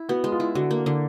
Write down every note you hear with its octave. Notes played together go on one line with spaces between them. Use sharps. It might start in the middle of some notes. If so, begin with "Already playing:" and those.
Already playing: E4
B3 F#4
G#3
F4
E4
D3 F#4
A#3
D3